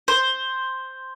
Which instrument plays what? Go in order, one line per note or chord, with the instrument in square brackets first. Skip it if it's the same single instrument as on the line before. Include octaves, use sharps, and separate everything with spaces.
[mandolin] C5